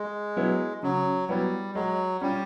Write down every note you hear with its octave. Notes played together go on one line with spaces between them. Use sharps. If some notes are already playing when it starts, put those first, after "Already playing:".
Already playing: G#3
F#3 B3 E4
C#3 F#3
F#3 G3 B3 E4
F#3 G#3
G3 C#4 F4